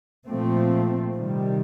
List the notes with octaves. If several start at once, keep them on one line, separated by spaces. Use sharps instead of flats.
A#2 F3 A3 C4
C3 D#3 G3